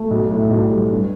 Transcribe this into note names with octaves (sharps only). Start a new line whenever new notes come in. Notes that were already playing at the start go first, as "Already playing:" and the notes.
Already playing: A3
B1
A2
B1
G3
G2